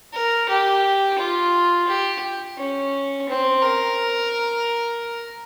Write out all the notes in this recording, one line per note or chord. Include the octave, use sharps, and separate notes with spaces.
A#4
G4
F4
G4
C#4
C4
A#4